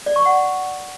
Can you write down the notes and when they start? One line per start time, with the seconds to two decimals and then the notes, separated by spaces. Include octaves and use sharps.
0.06 D5
0.16 C#6
0.25 F#5